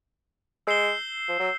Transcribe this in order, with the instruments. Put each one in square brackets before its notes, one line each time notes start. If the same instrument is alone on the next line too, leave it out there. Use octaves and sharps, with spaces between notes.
[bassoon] G#3 [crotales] E6 G6 C7 E7 G7
[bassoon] F3
F#3